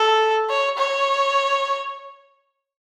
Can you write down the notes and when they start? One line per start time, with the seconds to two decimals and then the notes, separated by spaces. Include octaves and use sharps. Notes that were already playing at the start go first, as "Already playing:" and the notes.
Already playing: A4
0.49 C#5
0.78 C#5